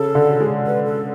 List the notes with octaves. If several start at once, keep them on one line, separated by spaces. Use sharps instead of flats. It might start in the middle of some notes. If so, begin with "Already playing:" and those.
Already playing: C#3 A4
D3
G#3
B4
A4